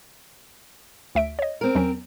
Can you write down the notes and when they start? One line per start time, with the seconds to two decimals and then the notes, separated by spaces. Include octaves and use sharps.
1.15 D2 E5 D7
1.39 C#5 D#5
1.61 C4 A#4
1.75 E2 F#3 C#4